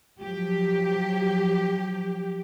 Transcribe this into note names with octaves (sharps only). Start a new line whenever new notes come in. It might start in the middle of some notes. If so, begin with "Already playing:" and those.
F3 F#3 G4